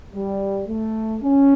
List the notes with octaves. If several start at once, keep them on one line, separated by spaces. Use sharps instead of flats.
G3
A3
C#4